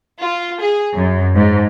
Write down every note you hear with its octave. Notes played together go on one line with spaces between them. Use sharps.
F4
G#4
F#2
G#2